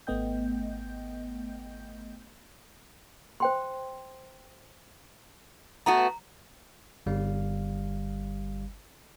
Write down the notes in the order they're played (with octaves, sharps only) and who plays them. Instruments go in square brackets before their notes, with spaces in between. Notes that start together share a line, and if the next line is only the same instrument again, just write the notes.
[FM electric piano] G#1 A3 B3 D#5 G5 G6
[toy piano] C5 G5 C6
[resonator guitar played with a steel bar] A3 B3 F#4 [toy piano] A#5
[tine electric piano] G1 G3 F5